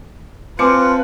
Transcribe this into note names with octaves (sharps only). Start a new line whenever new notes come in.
C4 F4 B4 G#5 A5 D6 C#7